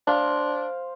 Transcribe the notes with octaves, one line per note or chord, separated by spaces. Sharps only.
D4 C5 F5